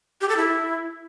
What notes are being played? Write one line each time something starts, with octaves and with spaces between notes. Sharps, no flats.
G4
A4
E4